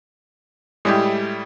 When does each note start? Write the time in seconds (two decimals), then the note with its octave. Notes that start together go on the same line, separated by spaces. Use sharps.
0.85 A2 G3 G#3 E4 G4